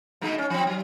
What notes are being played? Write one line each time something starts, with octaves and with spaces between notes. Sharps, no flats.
B2 G#3 D#4
C#4
F3 C4
F#3